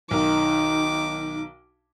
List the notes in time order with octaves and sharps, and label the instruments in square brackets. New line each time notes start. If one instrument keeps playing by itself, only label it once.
[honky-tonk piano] B1 A#4 [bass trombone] D#3 [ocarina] D#4 [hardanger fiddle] D6